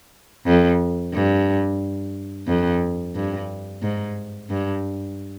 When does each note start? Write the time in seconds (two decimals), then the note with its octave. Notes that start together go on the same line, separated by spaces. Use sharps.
0.47 F2
1.14 G2
2.48 F2
3.16 G2
3.83 G#2
4.50 G2